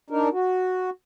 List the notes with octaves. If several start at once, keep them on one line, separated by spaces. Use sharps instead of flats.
D4 D#4 A#4
F#4